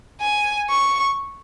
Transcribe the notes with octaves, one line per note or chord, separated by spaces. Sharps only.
G#5
C#6